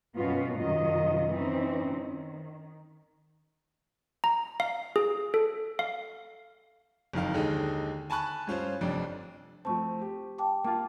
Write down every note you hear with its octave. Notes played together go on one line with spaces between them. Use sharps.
F#2 B2 B3 C#4 F4 F#4
F#2 C3 D#3 F#3 F4 D#5
E3 C4 C#4 D#4
D#3
A#5
F5
G#4
A4
F5
F#1 F2 D#3 F5
D#2 D3 G#3 D#4
G#5 A5 B5 C#6 F#6
G2 C#4 F4 C5
F1 F2 D4
F3 A3 C4 A5 C#6
G4
G5 A5 D6
A#3 F4 A5 D6